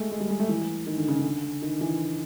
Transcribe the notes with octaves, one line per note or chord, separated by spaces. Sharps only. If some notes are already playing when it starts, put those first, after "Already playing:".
Already playing: G#3 A3
G#3
G3
G#3
A3
E3
D#3
D3
C#3
D3
D#3
E3